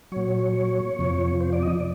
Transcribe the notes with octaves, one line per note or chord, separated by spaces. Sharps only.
A#2 F#3 C#5
F2 C3 F3
C5
D5
D#5
D5